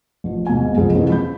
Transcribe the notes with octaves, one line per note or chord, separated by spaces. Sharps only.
A1 F3
D#1 G#2 B2 G#5
F#1 C2 F2 F3 G#3 G#4
F2 G#2 C3 E3 A#3 C#4
B5 G6